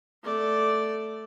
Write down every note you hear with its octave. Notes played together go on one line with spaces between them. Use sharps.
A3 D5